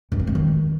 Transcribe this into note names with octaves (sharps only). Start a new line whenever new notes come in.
G2
C4
G#3
D#3